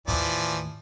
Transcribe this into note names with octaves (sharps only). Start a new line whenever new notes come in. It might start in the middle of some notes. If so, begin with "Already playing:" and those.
D#2 A2 E3 F3 D5